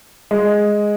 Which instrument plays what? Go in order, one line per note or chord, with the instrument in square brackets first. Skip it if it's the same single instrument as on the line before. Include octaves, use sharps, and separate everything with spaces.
[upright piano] G#3